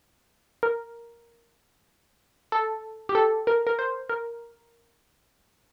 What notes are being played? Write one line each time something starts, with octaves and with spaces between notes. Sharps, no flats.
A#4
A4
G4
A4
A#4
A#4
C5
A#4